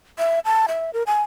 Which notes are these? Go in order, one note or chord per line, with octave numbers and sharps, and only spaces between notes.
E5
A5
E5
A#4
G#5